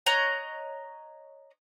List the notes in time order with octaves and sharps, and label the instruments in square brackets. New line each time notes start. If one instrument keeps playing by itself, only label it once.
[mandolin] C#5 D#5 A#5 F#6